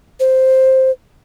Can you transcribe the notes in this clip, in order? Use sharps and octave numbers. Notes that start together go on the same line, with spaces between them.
C5